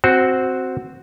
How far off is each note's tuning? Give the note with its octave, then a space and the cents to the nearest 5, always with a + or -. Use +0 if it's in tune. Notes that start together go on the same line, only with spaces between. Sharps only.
C4 +0 F#4 +0 C5 +0